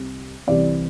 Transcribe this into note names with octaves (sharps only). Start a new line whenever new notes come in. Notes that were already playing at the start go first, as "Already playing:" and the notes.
Already playing: C2 C3 G3 C4
C2 C3 E3 C4 D5